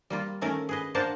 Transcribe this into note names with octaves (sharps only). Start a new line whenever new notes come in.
G3 A#3 F4
D#3 A3 C#4 A#4
G#4 B4 D#5
A#3 D4 A#4 C5 F#5 A5